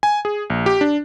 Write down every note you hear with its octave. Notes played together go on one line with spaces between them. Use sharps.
G#5
G#4
A#1
G4
D4